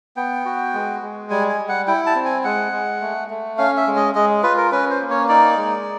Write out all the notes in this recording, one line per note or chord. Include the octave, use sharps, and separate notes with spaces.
B3 G5
F#4
G#3
G#3
G3 G#5
G#5
G3
F#5
E4 G5
A5
C4
G#5
G#3 F#5
G#3
A3
A3
C#4 F5
E5
G#3
D#5
G#3 D#5
F4 B4
A#4
C#4 B4
C5
A#3
C#5
D#4 D5
G#3